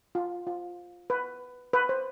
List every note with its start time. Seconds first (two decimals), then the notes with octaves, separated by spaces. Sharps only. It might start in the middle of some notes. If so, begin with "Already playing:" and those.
0.15 F4
0.47 F4
1.10 B4
1.73 B4
1.89 C5